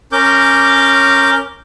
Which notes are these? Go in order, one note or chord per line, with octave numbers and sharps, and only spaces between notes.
C#4 A#4 D6 G6